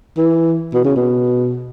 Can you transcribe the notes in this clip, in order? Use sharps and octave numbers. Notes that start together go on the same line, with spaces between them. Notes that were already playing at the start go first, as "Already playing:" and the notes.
E3
B2
C#3
B2